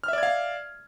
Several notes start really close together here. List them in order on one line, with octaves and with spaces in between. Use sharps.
F6 E5 D5 G#6 F5